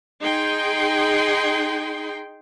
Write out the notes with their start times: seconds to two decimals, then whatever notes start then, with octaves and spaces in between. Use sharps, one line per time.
0.21 D#4 G#4 G5 C6